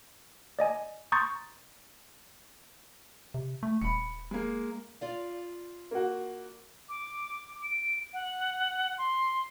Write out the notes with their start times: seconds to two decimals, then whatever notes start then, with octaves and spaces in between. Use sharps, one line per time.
0.59 D5 D#5 G#5
1.12 A#5 C6 C#6 D#6 G6 A6
3.34 C3
3.63 A3
3.82 D#1 B5 C#7
4.31 G#3 A#3
5.01 F4 D5 F5
5.91 A#3 F#4
6.89 D6
7.62 D7
8.13 F#5
8.98 C6